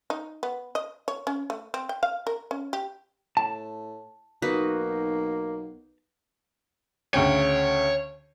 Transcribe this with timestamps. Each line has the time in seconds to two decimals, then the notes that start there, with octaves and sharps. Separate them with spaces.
0.10 D#4
0.43 B3
0.75 D#5
1.08 C#5
1.27 C#4
1.50 A3
1.74 C4
1.89 G5
2.03 F5
2.27 A#4
2.51 C#4
2.73 G4
3.37 A2 A5
4.42 B1 A#3 D#4 F#4 B4
7.14 D2 C#3 C#5 G5